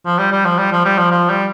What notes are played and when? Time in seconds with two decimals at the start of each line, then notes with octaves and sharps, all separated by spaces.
0.05 F3
0.19 G3
0.32 G3
0.45 F3
0.58 G3
0.72 F3
0.85 G3
0.98 F3
1.11 F3
1.29 G3